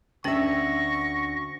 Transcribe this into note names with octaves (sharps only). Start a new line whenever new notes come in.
D2 C#4 E5 G5 C#6 A#6